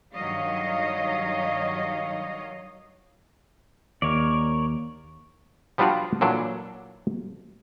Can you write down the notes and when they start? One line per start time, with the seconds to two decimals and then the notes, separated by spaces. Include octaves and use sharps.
0.15 G2 D#3 F#3 C#5 D#5 F5
4.02 D#2 A#4 C#5 D5
5.78 F3 G3 B3 D4 F4 F#4
6.21 A#2 E3 F#3 D4 A4